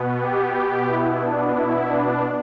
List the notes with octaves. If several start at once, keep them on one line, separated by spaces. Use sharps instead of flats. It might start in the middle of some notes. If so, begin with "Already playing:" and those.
Already playing: B2 B3
G4
E4
D4
E4
D4